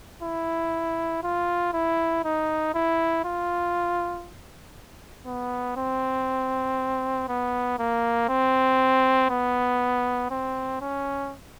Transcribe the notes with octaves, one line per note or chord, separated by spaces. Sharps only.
E4
F4
E4
D#4
E4
F4
B3
C4
B3
A#3
C4
B3
C4
C#4